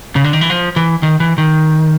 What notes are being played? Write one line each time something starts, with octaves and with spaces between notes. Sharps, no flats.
C#3
D3
D#3
E3
F3
E3
D#3
E3
D#3